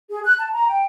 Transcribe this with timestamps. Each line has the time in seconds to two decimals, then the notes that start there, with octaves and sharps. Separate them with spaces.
0.11 G#4
0.24 F#6
0.38 A5
0.52 A#5
0.68 G5